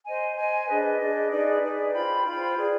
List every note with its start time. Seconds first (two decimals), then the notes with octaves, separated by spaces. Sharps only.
0.05 C5 D#5 G#5
0.37 C5 D#5 G#5
0.68 D4 G#4 B4 D#5
1.00 D4 G#4 B4 D#5
1.31 D#4 G#4 B4 D5
1.62 D#4 G#4 B4 D5
1.93 F4 C5 G5 B5
2.25 F4 C5 G5 B5
2.57 G#4 B4 D5